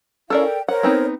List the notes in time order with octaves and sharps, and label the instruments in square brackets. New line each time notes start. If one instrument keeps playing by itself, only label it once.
[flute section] C#4 E4 F5 [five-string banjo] A4 A#4 D5
[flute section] G5
[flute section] A#4 C5 C#5 [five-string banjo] F#5
[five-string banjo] B3 C4 D#4